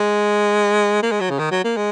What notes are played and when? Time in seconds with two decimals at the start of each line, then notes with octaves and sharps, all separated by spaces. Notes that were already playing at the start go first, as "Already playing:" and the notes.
Already playing: G#3
1.02 A#3
1.11 G#3
1.21 F#3
1.30 C#3
1.38 D#3
1.51 F#3
1.64 A#3
1.76 G#3